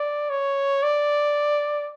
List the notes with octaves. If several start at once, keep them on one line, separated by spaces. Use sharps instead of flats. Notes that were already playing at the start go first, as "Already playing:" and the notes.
Already playing: D5
C#5
D5